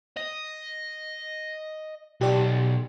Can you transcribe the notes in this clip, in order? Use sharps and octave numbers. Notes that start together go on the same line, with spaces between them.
D#5
B1 G4 D5